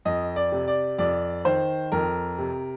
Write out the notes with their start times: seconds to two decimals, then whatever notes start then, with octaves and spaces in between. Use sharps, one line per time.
0.05 F2 D#5
0.36 D5
0.52 C3
0.68 D5
0.98 F2 D5
1.45 D#3 C5
1.92 F2 A#4
2.38 C3